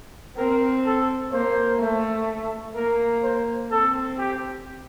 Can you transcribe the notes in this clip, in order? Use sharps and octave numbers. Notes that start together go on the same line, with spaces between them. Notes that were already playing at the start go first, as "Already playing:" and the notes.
C4 A#4
A4
A#3 C5
A3
A#3 A#4
C5
C4 A4
G4